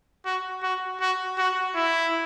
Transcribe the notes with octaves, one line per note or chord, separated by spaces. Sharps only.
F#4
F#4
F#4
F#4
E4